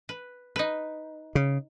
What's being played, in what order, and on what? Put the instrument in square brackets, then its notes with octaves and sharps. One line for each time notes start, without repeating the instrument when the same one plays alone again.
[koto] B4
D#4 B4
[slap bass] C#3